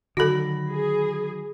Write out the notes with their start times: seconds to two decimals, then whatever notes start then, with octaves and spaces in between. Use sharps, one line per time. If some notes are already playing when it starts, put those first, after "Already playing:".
0.17 D3 D#3 F#3 F#4 A4 B5 A#6
0.71 G#4